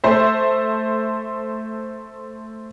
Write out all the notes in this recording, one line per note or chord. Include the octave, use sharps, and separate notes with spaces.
A3 C5 E5